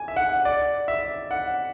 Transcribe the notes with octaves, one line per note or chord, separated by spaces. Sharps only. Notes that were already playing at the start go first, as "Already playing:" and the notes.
Already playing: G#5
E5
F#5
D5
E5
F#5